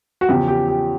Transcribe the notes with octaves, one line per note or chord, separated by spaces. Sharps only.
F#4
E2 C#3 F3 G4
G4
G4